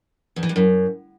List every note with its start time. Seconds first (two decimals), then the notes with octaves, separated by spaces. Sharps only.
0.36 E2
0.43 E3
0.49 G2
0.56 F#2